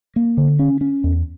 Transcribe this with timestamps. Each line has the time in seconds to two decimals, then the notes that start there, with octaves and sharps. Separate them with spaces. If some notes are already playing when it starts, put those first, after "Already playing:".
0.16 A#3
0.37 D3
0.59 C#4
0.81 C#4
1.04 E2